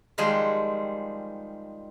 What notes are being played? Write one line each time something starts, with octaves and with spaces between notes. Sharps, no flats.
D#3 F3 G3 G#3 G#4